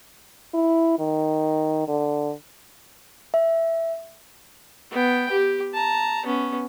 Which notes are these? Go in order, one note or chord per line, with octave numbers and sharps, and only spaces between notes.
E4
D#3
D3
E5
B3 G5
G4
A5 A#5
B3 C#4